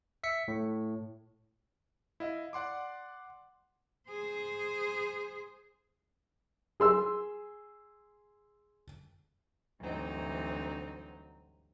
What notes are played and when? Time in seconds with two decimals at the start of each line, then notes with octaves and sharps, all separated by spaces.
0.23 E5 B6 C#7
0.48 A2
2.20 E4 D#5 F5
2.53 D5 F#5 C6 D6
4.10 G#4 C5
6.80 G#4 C6 E6
9.79 D2 G2 E3 F#3 C4 D#4